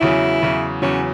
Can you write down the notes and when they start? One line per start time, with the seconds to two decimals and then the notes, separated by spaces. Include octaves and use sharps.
0.01 E2 C#3 F#3 E4
0.42 E2 C#3 F#3
0.82 E2 C#3 F#3 C#4